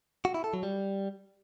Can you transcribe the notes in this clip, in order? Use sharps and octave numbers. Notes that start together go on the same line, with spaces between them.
F#4
E4
A4
F#3
G3